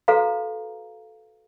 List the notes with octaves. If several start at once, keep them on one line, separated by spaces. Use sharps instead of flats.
F#4 A4 B4 F5 A#5